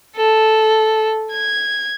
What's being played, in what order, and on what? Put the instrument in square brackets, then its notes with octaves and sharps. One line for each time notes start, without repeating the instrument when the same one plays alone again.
[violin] A4
G#6